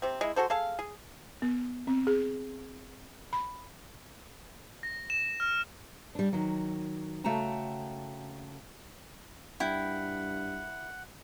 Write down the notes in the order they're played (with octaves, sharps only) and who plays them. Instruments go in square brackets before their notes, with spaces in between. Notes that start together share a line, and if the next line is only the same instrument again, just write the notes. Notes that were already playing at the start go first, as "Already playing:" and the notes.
[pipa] C3 C4
G#3 E4
G#3 F#4 A4 C5
G#4 A4 F5
G#4
[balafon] B3
C4
G#4
B5
[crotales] A#6
E7
F6
[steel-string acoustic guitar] G3 D4
D#3 F#3
C#3 A3 F#4 G5 A5 A#5
[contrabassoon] G2 [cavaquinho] E4 G5 [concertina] F#5